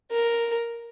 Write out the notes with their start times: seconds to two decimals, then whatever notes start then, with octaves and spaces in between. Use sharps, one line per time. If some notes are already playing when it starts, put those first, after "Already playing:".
0.11 A#4